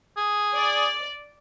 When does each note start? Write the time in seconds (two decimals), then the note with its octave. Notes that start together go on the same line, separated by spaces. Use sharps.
0.17 G#4
0.55 D5